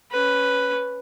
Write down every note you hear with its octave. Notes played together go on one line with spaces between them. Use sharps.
C#4 B4